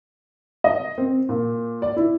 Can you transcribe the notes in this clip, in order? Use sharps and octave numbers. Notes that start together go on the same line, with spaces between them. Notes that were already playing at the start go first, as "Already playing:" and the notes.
D#5
C4
A#2
D5
E4